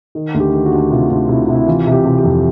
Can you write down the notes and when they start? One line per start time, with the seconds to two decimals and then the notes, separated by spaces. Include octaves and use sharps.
0.15 D#3
0.34 D2
0.40 G4
0.53 D#3
0.65 F#4
0.72 D2
0.91 C3 F4
1.10 D2
1.29 C3 E4
1.48 C3
1.55 E4
1.67 E3 F4
1.87 C3
1.92 G4
2.05 C3
2.18 G4
2.24 F2